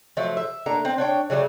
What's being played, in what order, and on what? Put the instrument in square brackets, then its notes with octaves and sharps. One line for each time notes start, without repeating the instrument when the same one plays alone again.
[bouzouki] F3 F#3 A3
E5
A3 A#3 D4 A#5
C4
D4 C#5 G5
C#3 F#3 G3 A3